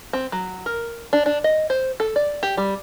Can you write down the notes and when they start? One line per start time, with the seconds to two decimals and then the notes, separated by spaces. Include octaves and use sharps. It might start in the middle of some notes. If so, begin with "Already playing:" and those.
0.13 C4
0.32 F#3
0.66 A#4
1.13 D4
1.26 D4
1.44 D#5
1.70 C5
2.00 A4
2.16 D5
2.43 G4
2.57 G3